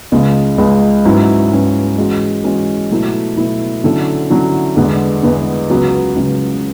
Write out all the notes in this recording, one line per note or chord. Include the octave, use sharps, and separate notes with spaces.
C#2 C#3 G#3
C#2 C#3 G#3
G#2 F#3 C#4 E4 B4
G#2 F#3 C#4 E4 B4
E3 G#3 C#4 F#4
E3 G#3 C#4 F#4
B2 F#3 A3 E4
B2 F#3 A3 E4
D3 F#3 C#4 E4 A4
D3 F#3 C#4 E4 A4
E2 D3 G#3 B3
E2 D3 G#3 B3
C#2 C#3 F#3 B3 F#4
C#2 C#3 F#3 B3 F#4